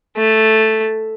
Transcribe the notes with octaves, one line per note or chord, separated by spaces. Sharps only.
A3